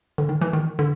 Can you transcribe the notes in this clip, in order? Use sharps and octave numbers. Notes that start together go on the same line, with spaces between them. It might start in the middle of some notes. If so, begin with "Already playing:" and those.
D3
D#3
E3
D#3
D3